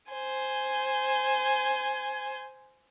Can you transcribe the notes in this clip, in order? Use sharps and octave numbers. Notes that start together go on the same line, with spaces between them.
C5 G#5